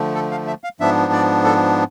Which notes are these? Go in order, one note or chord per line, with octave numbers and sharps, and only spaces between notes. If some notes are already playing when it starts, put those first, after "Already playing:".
Already playing: D3 F3 A3
A4
F5
E5
F5
G#2 F3 B3 D4 E5
D5
A4